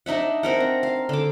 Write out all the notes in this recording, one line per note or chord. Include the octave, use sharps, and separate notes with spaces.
D4 D#4 E5 F#5
C4 A#4 F#5
A#5
F5
D3 D6